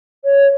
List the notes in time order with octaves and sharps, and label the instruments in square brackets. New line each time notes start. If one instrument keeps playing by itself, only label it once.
[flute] C#5